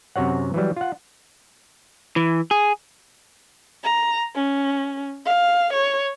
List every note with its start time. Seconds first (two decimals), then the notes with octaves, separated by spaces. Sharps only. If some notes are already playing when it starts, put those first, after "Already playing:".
0.16 F#2 C3 F#4 C#5 F#5
0.54 E3 F#3 G3
0.76 F4 F#5
2.16 E3
2.51 G#4
3.84 A#5
4.36 C#4
5.26 F5
5.73 C#5